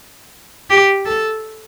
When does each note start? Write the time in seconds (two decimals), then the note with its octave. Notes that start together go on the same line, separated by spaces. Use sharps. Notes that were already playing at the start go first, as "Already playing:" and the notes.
0.70 G4
1.06 A4